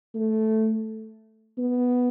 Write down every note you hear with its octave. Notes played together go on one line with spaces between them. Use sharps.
A3
B3